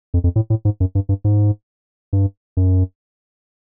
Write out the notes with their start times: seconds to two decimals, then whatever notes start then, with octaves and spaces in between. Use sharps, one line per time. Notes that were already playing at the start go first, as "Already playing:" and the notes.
0.14 F2
0.24 F2
0.36 A2
0.50 A2
0.65 G#2
0.80 F#2
0.95 G2
1.09 G2
1.24 G#2
2.13 G2
2.57 F#2